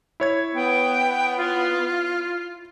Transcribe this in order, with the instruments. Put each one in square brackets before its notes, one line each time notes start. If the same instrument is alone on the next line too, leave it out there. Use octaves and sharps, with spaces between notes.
[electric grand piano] E4 C#5 G#6
[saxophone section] B3 [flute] G5
[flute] F4